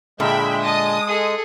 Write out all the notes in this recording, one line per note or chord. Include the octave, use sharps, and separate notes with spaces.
A#2 D3 G#3 E5 G5 B5
D#5 A5 D#6
G#4 A4